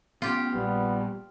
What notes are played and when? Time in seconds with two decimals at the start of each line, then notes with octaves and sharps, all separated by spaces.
0.22 B3 C#4 F4 G4
0.54 A#1 G3 B3